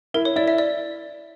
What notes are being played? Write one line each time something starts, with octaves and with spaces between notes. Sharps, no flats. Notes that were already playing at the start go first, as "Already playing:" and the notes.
E4 A#4
C#5
E4 D5
E5
D5